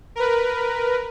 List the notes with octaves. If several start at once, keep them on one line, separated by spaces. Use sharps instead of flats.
A#4 B4